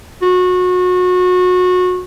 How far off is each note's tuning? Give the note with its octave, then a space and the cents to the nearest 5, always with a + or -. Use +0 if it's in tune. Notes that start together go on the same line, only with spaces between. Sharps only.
F#4 -25